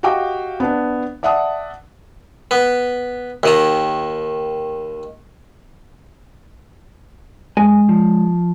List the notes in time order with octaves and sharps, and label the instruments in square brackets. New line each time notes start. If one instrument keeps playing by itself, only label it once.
[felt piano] F#4 G4 D#5 F5 G5 D6
B3 D4
D5 E5 F#5 A5 D#6
[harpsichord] B3
D#2 D#3 A#5
[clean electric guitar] F#2 G#5 [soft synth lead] G#3
[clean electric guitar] F3